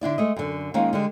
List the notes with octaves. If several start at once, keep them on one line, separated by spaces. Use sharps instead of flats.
D3 D4 E4 D5
G#3 A3 D#5
F#2 D3
D#3 G#3 A#3 C#4 F4
D3 G3 G#3